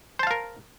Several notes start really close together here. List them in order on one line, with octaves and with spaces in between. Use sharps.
C5 A5 F5 A#4